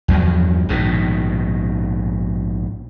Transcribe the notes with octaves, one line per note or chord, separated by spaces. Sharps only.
E2 G2 F3 F#3
A#1 G#2 B2 D#3